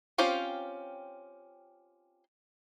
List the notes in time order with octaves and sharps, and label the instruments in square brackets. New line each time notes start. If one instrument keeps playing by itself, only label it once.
[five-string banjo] C4 C#4 F4 G4 C5